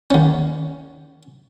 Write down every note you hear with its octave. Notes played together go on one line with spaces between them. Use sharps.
D#2 C#4